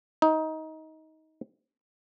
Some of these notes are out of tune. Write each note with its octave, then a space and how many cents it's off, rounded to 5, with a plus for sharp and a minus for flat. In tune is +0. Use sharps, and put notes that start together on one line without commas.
D#4 +20